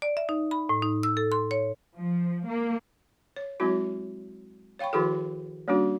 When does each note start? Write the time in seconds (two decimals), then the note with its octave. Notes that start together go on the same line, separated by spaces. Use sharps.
0.02 D5
0.17 E5
0.29 D#4
0.51 B5
0.69 A2
0.82 D#4
1.03 E6
1.17 A4
1.32 C6
1.51 C#5
1.96 F3
2.46 A#3
3.36 C#5
3.60 F#3 G#3 C4 E4 F#4
4.79 C#5 F5 G5 B5 C#6
4.93 D#3 F3 E4 F#4 G#4 A4
5.68 G3 A#3 C#4 D4 F#4